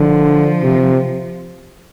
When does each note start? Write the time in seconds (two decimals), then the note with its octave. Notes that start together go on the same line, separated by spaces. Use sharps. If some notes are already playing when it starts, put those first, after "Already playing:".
Already playing: D3 F3
0.62 C3